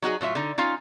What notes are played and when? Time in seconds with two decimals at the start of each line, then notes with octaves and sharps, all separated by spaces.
0.02 F#3 D#4 F#4 G#4
0.21 A2 F#3 F4 E5
0.35 D3 D#4
0.58 C#4 D#4 F4 F5